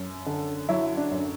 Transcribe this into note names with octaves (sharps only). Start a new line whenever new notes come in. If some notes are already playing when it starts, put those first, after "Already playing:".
Already playing: F#2
D3
F#3 E4
D4
F#2